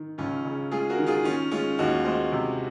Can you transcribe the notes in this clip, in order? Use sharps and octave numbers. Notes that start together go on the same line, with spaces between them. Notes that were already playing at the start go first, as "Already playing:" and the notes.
Already playing: D#3
C#2 C#4 F4
C#3
G#3 F4 G#4
F#4 A#4
D#3
F4 G#4
D#3 C#4 F4
G#3 C#4 F4
D#2 D#4 F#4
G#3 C5 D#5
C3